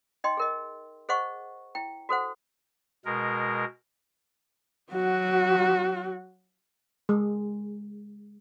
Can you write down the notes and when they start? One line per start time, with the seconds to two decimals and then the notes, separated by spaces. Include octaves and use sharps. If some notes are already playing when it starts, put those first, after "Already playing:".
0.24 D#4 D#5 G5 C6
0.37 G#4 A#4 D#5
1.09 G#4 C5 D#5 F#5 C#6
1.75 E4 G5
2.09 F#4 A4 C5 F#5
3.05 B2 G#3 A#4
4.93 F#3 F#4
7.09 G#3